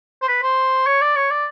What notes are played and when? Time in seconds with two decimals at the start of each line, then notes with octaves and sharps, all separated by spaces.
0.22 C5
0.28 B4
0.42 C5
0.87 C#5
1.01 D5
1.16 C#5
1.30 D5